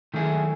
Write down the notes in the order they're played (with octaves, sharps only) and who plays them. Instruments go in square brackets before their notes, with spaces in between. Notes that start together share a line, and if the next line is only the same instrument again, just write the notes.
[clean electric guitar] D#3 F#3 A3 E4 G#4